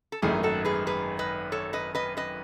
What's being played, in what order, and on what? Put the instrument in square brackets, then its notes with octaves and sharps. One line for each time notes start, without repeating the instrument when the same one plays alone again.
[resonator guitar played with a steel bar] A4
[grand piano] G#1 F#2 D#3 A3 D#4 [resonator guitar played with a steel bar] E4 G#4
[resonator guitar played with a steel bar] F#4 A4
G#4 B4
G#4 B4
B4 D#5
A4 C#5
B4 D#5
B4 D#5
B4 D#5